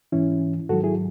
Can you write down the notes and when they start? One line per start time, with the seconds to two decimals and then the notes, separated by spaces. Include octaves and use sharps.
0.12 G#2 E3 C#4 E4
0.69 G#2 D#3 F#3 F#4 A4
0.83 E4 G#4